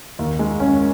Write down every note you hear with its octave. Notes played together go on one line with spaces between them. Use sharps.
D#2
G#3
C#4